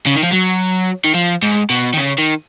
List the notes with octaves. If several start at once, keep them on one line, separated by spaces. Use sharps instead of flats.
C#3
D#3
F3
F#3
D#3
F3
G#2
B2
D#3
C#3
D#3